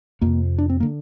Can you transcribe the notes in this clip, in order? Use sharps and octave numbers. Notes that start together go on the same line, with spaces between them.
F2 C3 A#3
D4
C4
D3 A#3